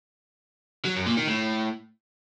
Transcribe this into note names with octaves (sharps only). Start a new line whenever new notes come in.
F#3
F#2
A#2
D#3
A2